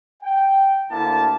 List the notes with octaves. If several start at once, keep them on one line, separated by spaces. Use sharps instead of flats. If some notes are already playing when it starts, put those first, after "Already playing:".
G5
D2 D3 A#3 E4 A5